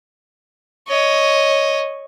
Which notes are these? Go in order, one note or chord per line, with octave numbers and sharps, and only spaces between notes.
C#5 D#5